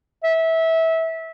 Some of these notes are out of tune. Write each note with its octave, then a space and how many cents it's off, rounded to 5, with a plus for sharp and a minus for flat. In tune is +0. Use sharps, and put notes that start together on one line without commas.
E5 -20